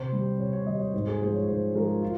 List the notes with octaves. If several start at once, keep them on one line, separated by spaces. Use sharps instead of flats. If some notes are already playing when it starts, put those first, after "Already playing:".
Already playing: C3 C5
G3
C3 C#5
C#5
G3 D#5
C#5
G#2 C5
G#4
F3 G#3 C5
C#5
G#2 C5
F3 G#3 A#4
F4